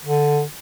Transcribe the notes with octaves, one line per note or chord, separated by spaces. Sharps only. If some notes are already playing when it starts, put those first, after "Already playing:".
D3